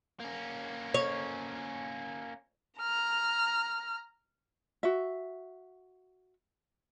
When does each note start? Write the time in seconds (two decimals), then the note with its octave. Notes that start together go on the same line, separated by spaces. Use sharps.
0.20 A#3 C#4
0.94 C#5
2.79 A#5 F6
4.83 F#4 E5